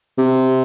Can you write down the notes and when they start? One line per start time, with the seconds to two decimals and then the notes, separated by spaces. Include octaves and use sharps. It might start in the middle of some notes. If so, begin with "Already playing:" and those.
0.18 C3